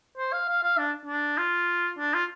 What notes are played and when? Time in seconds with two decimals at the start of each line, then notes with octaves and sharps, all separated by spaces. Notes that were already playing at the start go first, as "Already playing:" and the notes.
0.18 C5
0.32 F5
0.48 F5
0.63 F5
0.78 D4
1.06 D4
1.38 F4
1.98 D4
2.14 F4